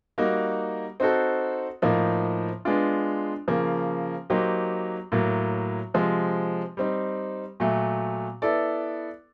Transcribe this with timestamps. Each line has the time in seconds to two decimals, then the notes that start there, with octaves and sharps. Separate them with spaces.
0.18 G3 A#3 D#4 F#4
1.00 C4 D#4 F#4 A4 C5
1.82 A2 F3 A#3 D#4
2.65 G#3 B3 D4 F4
3.48 C#3 F3 A#3
4.30 F#3 A#3 D#4 G4 C5
5.12 A2 F#3 A#3
5.94 C3 F3 G#3
6.77 G3 C4 D#4
7.60 A#2 F#3 A3
8.42 B3 E4 A4 D5